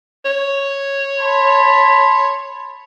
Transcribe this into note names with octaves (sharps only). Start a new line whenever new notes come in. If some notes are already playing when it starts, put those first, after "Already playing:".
C#5
A5 B5 C6